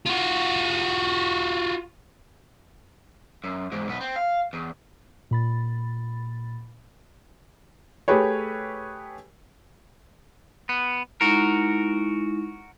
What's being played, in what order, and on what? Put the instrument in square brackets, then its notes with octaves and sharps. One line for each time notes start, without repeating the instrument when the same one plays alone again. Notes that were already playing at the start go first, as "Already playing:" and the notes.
[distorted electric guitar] F4 F#4
[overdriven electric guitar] F#2
E2 G#2
B1 B3
C4
F5
E2
[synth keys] A#2 B5 A6
[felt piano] A3 G4 G#4 B4 C#5
[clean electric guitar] B3
[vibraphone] G#3 D#4 E4 [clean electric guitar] F#4 A#4